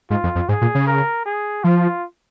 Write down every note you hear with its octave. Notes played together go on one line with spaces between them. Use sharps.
G#2 F4
F2
F2
G#2 G#4
A#2
C#3
A#4
G#4
F3 F4